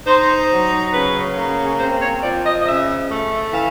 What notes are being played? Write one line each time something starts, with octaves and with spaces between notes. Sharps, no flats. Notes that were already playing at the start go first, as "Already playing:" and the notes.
D#4 C5
F#3
C#3 B4
A#3
C4 C5
C#5
F3 D5
D#5
D#5
C#3 E5
A3
E3 F5